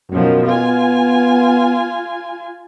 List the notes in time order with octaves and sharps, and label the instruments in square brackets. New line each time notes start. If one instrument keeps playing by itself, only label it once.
[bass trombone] F#2 [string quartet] B2 D#3 F3
[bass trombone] B3 [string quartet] F4 G#5